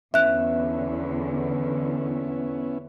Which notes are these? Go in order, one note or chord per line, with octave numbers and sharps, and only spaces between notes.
E2 D3 B3 C#4 E4 E5 F#6